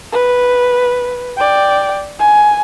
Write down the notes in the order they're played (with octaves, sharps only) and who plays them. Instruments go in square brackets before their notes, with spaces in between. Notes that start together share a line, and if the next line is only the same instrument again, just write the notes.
[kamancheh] B4
D5 G5
G#5